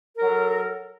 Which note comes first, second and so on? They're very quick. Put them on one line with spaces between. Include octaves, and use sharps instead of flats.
A#4 F#3 A4